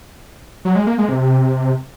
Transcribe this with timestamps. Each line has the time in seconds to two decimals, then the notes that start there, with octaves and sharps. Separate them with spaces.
0.65 F#3
0.76 G#3
0.87 A#3
0.98 G#3
1.09 C3